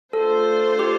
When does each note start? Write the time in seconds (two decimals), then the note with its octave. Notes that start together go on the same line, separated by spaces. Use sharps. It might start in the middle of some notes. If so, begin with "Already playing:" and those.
0.13 A3 D4 F4 A4 C5
0.79 G4